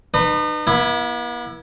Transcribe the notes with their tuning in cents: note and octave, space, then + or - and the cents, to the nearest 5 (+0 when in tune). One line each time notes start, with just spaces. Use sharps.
D#4 -40 B4 +0
B3 -45 E4 +0